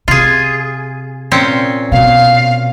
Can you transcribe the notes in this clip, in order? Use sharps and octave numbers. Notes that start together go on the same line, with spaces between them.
C3 F4 G#4
A#2 C4 C#4
B2 F5